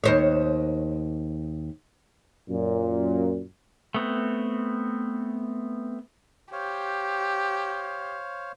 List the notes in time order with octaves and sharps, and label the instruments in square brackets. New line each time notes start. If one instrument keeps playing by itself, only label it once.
[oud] D#2 C5 C#5
[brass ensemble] F#2 A#2
[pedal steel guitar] A3 B3 C4
[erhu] G4 [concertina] C5 C#5 F5